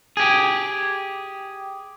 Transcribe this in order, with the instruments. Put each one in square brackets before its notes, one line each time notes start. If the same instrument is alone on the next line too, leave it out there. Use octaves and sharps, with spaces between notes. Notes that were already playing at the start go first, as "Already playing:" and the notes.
[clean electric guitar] G4 G#4